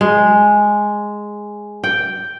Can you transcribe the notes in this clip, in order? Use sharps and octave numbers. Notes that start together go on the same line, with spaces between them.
G#3
G5